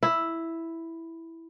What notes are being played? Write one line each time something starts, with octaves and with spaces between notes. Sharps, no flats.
E4